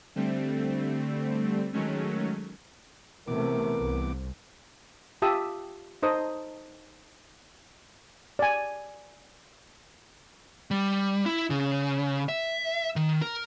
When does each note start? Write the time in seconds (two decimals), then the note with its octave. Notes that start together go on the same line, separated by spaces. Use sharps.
0.15 D3 G3 A3 C4
1.73 D#3 F#3 G#3 A3 C#4
3.28 C3 E3 A3 B3 A#4 D6
3.77 C2
5.22 F4 G4 E5 A5 D#6 E6
6.03 D#4 A4 C5 D#5 D#6
8.39 D5 G#5
10.71 G3
11.26 E4
11.50 C#3
12.29 E5
12.96 D#3
13.22 A#4